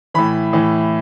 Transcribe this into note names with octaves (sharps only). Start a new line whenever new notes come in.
A2 E3 B5
A2 E3